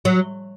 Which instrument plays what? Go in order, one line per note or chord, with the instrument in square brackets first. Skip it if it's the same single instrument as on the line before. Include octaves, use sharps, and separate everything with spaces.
[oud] F#3